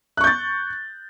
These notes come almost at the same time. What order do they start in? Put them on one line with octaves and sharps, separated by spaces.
F#6 C#6 G6 A6